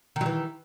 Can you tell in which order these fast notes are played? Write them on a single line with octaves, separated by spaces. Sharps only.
D#3 F#3 E3